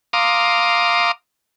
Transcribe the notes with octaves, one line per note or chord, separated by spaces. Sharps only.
F5 A#5 C6 D6 D#6